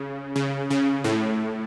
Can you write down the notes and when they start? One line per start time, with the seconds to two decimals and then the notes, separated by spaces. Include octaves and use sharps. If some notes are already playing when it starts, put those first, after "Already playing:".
Already playing: C#3
0.36 C#3
0.70 C#3
1.04 A2